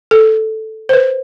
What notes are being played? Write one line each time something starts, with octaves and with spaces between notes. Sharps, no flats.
A4
C5
B4